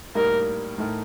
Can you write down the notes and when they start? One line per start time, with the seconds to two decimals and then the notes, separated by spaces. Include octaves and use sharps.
0.15 A2 G3 A#3 D#4 A#4
0.78 A2 A3 D#4 A#4